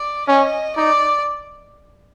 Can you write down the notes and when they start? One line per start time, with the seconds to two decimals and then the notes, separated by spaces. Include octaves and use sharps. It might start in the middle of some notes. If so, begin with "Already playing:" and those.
Already playing: D5
0.28 C#4 D#5
0.76 D#4 D5